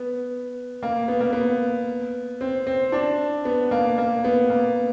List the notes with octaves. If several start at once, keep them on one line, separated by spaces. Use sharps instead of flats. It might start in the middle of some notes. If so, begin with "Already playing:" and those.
Already playing: B3
A#3
B3
A#3
B3
C4
C4
D4
B3
A#3
A#3
B3
A#3